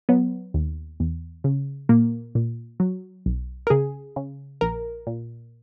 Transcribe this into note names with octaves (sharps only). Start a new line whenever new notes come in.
F#3 B3
D#2
E2
C#3
A#2 A#3
A#2
F#3
B1
A#4
C#3 G#4
C#3
A#1 A#4
A#2